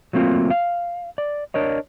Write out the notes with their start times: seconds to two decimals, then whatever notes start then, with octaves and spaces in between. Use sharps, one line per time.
0.13 F#3 A3 A#3 C4 F4
0.50 F5
1.18 D5
1.54 D4 A#4 C#5 D#5